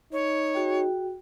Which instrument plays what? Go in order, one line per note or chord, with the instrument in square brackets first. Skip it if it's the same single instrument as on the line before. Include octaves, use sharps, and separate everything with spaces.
[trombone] D#4 [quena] C#5
[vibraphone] F#4 G#4 G5